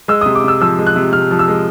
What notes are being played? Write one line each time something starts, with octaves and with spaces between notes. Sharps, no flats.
G#3 E6
D#6
C3
D6
C3 E6
F3 E6
G#3
F#6
C3
C3 F6
F3
E6
G#3